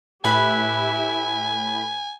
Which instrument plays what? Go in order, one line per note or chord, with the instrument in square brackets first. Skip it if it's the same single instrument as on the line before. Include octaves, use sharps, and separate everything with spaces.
[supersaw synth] A2 B5 [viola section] E4 G4 E5 [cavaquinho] B4 [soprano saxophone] G#5